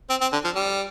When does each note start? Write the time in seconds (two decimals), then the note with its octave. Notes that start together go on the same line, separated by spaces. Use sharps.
0.10 C4
0.21 C4
0.32 D3
0.44 F3
0.55 G3